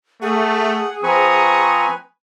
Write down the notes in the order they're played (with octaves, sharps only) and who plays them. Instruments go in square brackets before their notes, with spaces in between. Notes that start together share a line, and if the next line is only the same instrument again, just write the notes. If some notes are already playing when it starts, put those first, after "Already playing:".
[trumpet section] A3 [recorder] G#4 [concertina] F#5
[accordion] F3 C4 [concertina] B4 G#5 [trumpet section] A#5 C#6 D#6